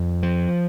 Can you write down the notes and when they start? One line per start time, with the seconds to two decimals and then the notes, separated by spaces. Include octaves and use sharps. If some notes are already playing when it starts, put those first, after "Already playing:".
Already playing: F2
0.23 F3